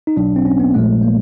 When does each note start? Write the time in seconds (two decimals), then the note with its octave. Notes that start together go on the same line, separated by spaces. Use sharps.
0.07 D#4
0.17 B1 B2 F#3 D4
0.36 C4
0.46 C#4
0.60 B3
0.74 A#1 A#2 F3 G#3 A3
1.03 A#3